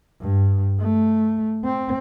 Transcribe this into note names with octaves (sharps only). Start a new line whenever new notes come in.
G2
A3
C4